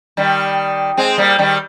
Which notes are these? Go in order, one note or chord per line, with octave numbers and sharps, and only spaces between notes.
D#3 G3
G#3 C4
G3 A#3
D#3 G3